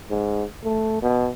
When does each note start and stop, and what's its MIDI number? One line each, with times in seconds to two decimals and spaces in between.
0.10 0.43 44
0.63 1.00 57
1.02 1.29 47